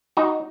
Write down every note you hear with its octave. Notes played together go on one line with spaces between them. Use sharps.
D#4 F#4